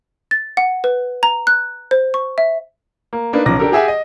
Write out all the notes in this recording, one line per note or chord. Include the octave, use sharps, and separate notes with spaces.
A6
F#5
B4
A#5
F#6
C5
C#6
E5
A#3
A#3 D4 D#4 B4
B1 C#3 F3 D6 A#6
D4 G4 A4 A#4
G4 G#4 E5 F#5 G#5
D#5